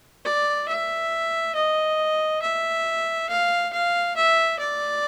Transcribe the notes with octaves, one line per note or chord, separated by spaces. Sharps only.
D5
E5
D#5
E5
F5
F5
E5
D5